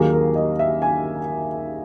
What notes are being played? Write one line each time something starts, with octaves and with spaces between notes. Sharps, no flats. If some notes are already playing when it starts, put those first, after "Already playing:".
Already playing: D#2 D#3 F#3 A#3 G#4
A#4
D#5
E5
G#5